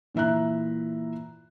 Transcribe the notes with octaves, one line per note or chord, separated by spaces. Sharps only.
A#2 E3 E5 A#5 F#6